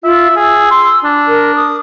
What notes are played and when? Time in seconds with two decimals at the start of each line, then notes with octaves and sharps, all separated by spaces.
0.04 F4 E5
0.36 G#4 E6
0.71 C6
1.04 D4
1.28 A#4
1.56 D#6